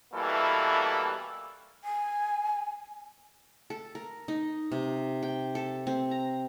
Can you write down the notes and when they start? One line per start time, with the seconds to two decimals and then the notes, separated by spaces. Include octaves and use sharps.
0.14 B2 E3 G3 A#3 E4 A4
1.84 G#5
3.70 A4
3.95 A#4
4.28 D#4
4.72 C3
5.23 G5
5.55 A4
5.87 C4
6.11 A#5